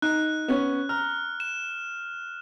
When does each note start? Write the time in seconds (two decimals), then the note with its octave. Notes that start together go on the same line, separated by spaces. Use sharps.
0.02 D#4 F#6
0.48 B3 C#4
0.89 A#5 F6
1.40 E7